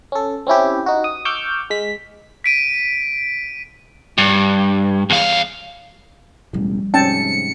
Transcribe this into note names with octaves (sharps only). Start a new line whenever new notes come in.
C#4 A4
C4 C#4 E4 G4
D#4 F#4
D#6
C#6 D6 E6 F6 G6
G#3 B6
B6 D7 D#7
G2
E2 F5
E1 A1 E2 F3 G3
G#2 C3 C#4 G5 A5 C#7